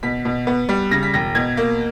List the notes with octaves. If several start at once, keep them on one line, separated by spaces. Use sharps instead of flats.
B2 B6
B2
B3
G3
C#3 A#6
B6
E1 A#6
B2 G#6
A#3